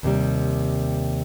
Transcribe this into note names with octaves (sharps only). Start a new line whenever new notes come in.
D#2 C3 G3